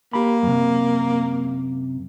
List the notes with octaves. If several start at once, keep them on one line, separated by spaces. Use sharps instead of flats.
A#3 G4 B5
F#2 C3